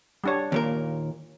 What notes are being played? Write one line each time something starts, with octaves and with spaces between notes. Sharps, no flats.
G3 D4 C#5
D#2 A#2 A#4